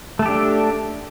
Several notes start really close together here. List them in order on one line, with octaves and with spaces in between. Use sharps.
A3 A4 G4 D4